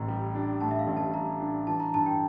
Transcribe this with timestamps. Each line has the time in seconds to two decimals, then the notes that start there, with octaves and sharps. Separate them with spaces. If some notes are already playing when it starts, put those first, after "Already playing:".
Already playing: A1 A2 A#5
0.08 G3
0.35 D4
0.61 A2 A5
0.71 E5
0.79 F5
0.87 A1
0.97 A5
1.14 G3 A#5
1.40 D4
1.67 E3 A5
1.80 A#5
1.94 G2 A5
2.06 G5